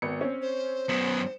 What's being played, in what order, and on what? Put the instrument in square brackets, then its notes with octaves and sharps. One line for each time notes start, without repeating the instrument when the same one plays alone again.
[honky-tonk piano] G#1 B3 C#7
C4 C#4
[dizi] C5
[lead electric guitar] F#2 B3 [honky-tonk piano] C#7 E7